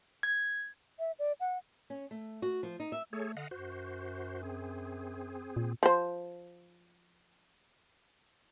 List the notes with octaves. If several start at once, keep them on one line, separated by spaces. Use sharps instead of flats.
G#6
E5
D5
F#5
C#4
A3
F#4
F3
D#4
E5
A3 G#4 A4 C#5
D3 D#5 F5 F#5
F#2 F#4 C5
C4 G#4
A#2
F3 C5